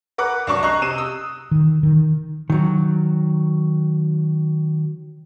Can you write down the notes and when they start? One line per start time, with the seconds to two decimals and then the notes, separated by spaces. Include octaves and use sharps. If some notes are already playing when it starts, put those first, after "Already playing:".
0.18 A#4 B4 F#5 D6 F#6
0.47 C2 F#3 D4 C#6 D6
0.63 D#5 A#5 C#6 F#6 C7
0.82 C3 D#7 E7
0.98 D#6 E6
1.51 D#3
1.83 D#3
2.50 D#3 F#3